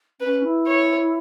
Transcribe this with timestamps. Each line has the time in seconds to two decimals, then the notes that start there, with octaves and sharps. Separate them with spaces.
0.20 C#4 B4
0.44 E4
0.67 C#5